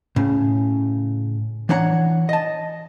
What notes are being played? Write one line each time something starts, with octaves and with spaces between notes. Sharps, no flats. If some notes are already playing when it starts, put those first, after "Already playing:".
A2 C#3
E3 D4 C#5 F#5 A#5
D#5 A5